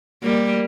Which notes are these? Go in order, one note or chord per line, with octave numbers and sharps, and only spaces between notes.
G3 A#3